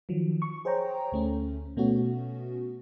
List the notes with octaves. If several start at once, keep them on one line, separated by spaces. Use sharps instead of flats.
D#3 F3 F#3
C#6
G#4 C5 C#5 G5 A#5
D2 A3 C#4
B2 A3 B3 C#4 F#4